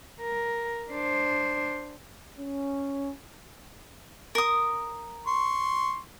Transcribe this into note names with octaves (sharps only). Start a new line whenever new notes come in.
A#4
D4 C5
C#4
A#4 D#6
C6 C#6